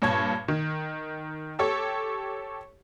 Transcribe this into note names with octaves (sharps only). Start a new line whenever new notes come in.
G2 A#2 C#5 A5 G#6
D#3
G4 A4 C#5